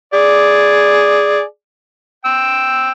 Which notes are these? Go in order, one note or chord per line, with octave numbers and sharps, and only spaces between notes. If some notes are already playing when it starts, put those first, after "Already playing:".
G#4 D5
G5 E6